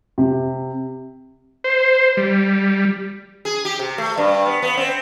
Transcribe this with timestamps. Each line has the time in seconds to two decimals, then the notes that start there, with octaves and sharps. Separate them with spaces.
0.18 C3
1.64 C5
2.17 G3
3.45 G#4
3.65 G4
3.79 C3
3.98 A3
4.17 G2
4.46 B3
4.62 B3
4.77 C4